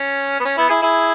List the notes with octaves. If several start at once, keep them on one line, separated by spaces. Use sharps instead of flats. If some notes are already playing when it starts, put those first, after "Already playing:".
Already playing: C#4
B3
C#4
B3 E4
E4 G#4
E4 G#4